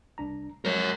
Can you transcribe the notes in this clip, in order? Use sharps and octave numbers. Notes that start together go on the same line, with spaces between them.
C2 D4 A#5
F#3 G#3 A#4 C#5